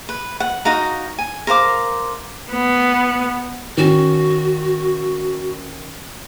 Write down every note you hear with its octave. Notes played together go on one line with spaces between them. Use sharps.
B4
F#5
D#4 F#4 F5 A#5
G#5
A#4 C5 F5 D6
B3
D#3 C#4 F#4